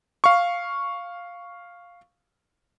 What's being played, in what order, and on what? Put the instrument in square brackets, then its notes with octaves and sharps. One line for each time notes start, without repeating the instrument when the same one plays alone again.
[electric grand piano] F5 C#6